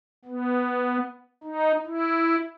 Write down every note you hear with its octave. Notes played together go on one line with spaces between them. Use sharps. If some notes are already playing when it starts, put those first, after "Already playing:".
B3
D#4
E4